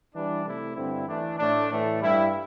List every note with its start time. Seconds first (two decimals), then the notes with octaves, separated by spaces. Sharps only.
0.13 E3 G3 D4
0.44 C3 A3 E4
0.75 G2 D3 C4 E4
1.07 E3 A3 D4
1.38 A2 A3 D4
1.69 A2 E3 A3
2.01 G2 G3 E4